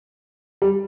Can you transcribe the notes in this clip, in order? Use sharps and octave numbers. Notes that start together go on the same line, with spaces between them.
G3